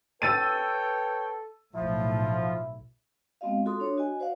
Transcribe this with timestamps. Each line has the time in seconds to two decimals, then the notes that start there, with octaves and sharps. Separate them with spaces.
0.22 A4 B4 C#5 G5 E6 A6 D#7
1.74 B1 A2 F3 E4
3.41 G#3 B3 C4 F#4 D#5 F5
3.66 F4 F#4 A4 C6 D#6
3.80 D4 C#5
3.98 F#4 D#5 G#5
4.19 F#4 C5 D5 F5 F#5